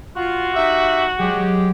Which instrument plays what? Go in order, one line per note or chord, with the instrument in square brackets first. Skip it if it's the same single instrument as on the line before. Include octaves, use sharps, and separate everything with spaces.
[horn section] F4 [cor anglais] F#4
[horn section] D#4 G4 E5
[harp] F#3 [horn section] G#3 G4